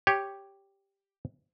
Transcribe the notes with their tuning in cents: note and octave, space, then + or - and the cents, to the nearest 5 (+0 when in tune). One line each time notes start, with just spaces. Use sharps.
G4 +0 C#5 +0